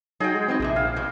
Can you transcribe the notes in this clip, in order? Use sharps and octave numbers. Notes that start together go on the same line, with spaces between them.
F#3 D#4 F#4 G#4 G5
G#3
E3 B3 C4 D#4
A#1 A2 C3 E4
C4 F5
G2 B2 G#3